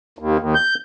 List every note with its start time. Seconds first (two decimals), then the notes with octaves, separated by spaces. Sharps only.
0.19 D#2
0.39 D#2
0.55 G6